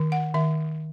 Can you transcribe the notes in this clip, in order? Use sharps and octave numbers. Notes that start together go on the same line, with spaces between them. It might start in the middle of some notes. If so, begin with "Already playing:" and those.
Already playing: D#3
F#5
D#3 E5